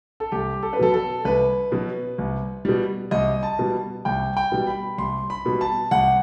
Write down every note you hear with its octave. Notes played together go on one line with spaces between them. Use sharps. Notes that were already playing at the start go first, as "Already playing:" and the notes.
A4
C2 G4
A4
B4
B2 F#3 A4
A4
C2 B4
B2 F#3
C2
B2 G3
C2 D#5
A5
B2 G3
C2 G5
G5
B2 G3
B5
C2 C6
B5
B2 G3
A5
C2 F#5